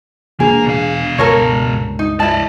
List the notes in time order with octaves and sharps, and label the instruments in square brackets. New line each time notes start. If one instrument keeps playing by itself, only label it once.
[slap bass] E1 D4 [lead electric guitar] A#3 [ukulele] G#4
[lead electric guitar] B2 F5
[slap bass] C#2 G2 [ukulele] A4 A#4 C#5
[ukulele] D#4
[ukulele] E4 A5 [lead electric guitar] D5 D#5